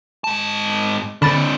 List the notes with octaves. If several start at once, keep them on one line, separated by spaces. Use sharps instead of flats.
G#2 A5
D3 C4 D4 B5 A6